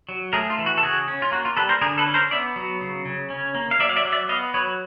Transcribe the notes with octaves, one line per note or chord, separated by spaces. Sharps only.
F#3
A3 G#4 A#4
F4
E3
F#4
A4
C#3 F#4 G#4
C#4
F4
A#3 F#4
F4
G3 A4 B4
A#4 C5
D3 G#4 A#4
A4 B4
C#4
A#4 C5
B3 D5 E5
F#3
C#3
C#3
C#4
A#3
F5
F#3 D5 E5
F5
D5 E5
F#3
D5 E5
B3 D#5 F5
F#3 B4 C#5